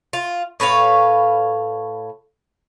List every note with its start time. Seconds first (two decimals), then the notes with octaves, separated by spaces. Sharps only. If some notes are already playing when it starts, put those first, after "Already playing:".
0.13 F4
0.60 A2 B4 C#5 F5